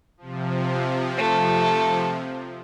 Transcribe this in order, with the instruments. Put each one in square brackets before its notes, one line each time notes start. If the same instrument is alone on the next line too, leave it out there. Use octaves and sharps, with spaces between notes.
[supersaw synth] C3 F3
[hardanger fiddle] A3 A4